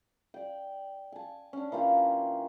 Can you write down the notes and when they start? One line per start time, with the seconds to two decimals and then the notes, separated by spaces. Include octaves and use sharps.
0.34 D5 G5
1.12 G#5 A5
1.53 C#4 D4
1.72 E3 A#3 F4 G4